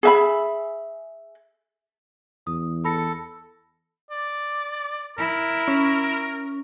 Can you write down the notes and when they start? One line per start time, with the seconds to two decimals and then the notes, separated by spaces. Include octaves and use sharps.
0.03 G#4 E5 B5
2.47 E2 D#6
2.84 A4 B5 A#6 C#7
4.11 D5
5.18 E4 A#4
5.68 C#4